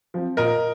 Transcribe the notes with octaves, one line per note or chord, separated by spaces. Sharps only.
F3 C4
A#2 A#4 D#5